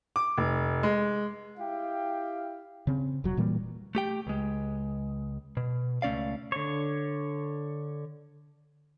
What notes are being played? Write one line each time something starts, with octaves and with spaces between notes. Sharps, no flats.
D6
F1
G#3
E4 G4 F5 G5
C#3 C4
F1 F#3
A#2 E3 G3 A#3
A3 G4 G5
C#2 G#3
B2
C#2 A3 C#4 D5 F5
D3 C#5